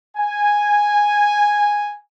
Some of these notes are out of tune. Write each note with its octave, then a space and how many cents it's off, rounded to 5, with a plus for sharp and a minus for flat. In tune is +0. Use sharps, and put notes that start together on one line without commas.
G#5 -5